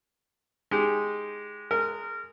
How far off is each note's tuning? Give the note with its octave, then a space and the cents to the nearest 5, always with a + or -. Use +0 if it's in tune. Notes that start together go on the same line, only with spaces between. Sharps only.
G#3 +0 D#4 +0 G4 +0
G#3 +5 A#4 -25